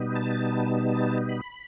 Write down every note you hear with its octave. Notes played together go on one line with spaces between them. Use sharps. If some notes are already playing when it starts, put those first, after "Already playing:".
Already playing: B2 G3 B3 D#4
A5
B5